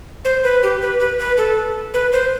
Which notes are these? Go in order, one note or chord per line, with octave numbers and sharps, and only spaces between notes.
C5
B4
G4
B4
B4
B4
A4
B4
C5